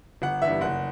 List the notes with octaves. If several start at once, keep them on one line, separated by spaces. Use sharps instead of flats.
G1 F#5
E3 E5
G2
F#1 F#5